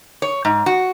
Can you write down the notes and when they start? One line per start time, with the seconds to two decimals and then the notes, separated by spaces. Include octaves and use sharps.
0.22 C#5
0.45 G#2
0.66 F#4